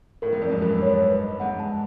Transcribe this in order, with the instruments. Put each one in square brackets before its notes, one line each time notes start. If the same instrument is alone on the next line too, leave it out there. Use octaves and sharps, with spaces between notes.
[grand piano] A2 [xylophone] A#4
[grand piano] G#2
[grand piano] F2 [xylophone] D5
[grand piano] F#2
[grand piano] G2 [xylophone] A#4
[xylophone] C#5
B4
D#5
[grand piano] G#2 [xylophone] F#5
[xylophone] A5